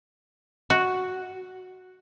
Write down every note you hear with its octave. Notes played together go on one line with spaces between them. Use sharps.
F#4